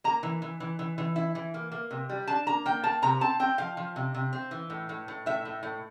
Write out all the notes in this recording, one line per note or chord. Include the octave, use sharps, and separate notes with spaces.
A#3 A#5
E3
E3
E3
E3
E3
E4
E3
A#3
A#3
C3
G3
D4 A5
A#3 A#5
A#3 G5
A#3 A5
C3 A#5
C4 A5
C4 G5
F3 F5
F3
C3
C3
C4
E3
A2
A2
A2
A2 E5
A2
A2